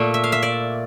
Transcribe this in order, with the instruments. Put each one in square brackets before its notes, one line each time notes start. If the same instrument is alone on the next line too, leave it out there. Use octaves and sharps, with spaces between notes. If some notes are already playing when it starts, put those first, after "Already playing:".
Already playing: [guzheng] A#2 A3
E5
F5
E5
D5